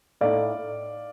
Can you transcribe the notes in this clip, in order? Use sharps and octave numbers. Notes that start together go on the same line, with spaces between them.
A2 A3 D#4 D5 F5